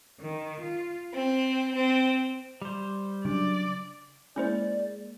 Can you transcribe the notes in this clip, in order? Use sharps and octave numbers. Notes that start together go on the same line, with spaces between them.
D#3
F4
C4
C4
G3 C5
C#3 F#3 D4 D5
G#3 A#3 C#4 E4 C5 D5